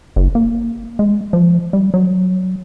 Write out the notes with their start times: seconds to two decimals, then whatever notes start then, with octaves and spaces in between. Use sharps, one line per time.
0.16 F#1
0.35 A#3
0.99 G#3
1.33 F3
1.73 G3
1.94 F#3